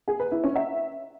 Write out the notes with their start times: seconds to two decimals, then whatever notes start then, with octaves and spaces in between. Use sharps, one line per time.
0.08 G#4
0.20 B4
0.32 E4
0.44 C#4
0.56 E5